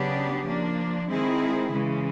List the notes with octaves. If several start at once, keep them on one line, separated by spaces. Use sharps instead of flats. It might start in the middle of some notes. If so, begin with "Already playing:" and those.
Already playing: C#3 F#3 B3 D4 G4
F3 A#3 D4
D#3 G#3 C4 E4 G#4
C#3 E3 G#3